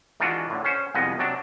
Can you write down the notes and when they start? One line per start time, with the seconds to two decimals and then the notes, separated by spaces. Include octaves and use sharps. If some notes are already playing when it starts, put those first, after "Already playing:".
0.20 D#3 E3 G#3 D4 F4 F#4
0.50 A2 D3
0.65 C#4 C5
0.95 C2 F2 F3 G#3 B3 D#5
1.19 C3 F#3 D4